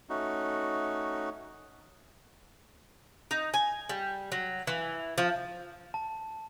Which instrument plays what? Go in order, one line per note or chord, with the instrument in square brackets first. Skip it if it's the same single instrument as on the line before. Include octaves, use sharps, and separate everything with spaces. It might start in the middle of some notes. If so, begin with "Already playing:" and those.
[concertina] A3 C#4 D#4 F#4
[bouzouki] D#4
G#5
G3
F#3
E3
F3
[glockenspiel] A5